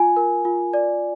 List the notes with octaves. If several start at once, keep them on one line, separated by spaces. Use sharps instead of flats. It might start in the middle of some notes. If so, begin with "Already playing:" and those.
Already playing: F4 G#5
A#4
F4
D5